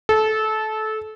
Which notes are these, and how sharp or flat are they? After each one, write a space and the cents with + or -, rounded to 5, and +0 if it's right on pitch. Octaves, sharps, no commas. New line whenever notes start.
A4 -20